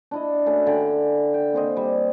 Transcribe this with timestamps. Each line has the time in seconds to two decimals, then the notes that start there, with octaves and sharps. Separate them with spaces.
0.11 D4 E4 D#5
0.46 A3 C#4 F#4
0.67 D3 D5 G5 G#5
1.34 G5
1.53 A#3 C4 C5 D#5
1.76 G3